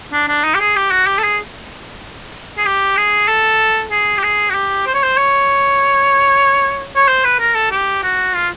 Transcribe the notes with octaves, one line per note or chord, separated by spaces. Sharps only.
D4
D4
D#4
G4
G#4
G4
F#4
G4
A4
G#4
G#4
G4
G#4
A4
G#4
G4
G#4
F#4
G4
C5
C#5
C5
C#5
C#5
C5
B4
A#4
A4
G4
F#4
F4